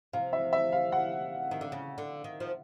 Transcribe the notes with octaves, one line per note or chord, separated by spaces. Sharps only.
C3 F5
E5
E5
F5
F#5
D#3
D3
C#3
D3
D#3
F3